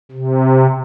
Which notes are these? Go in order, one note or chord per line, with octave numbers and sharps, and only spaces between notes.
C3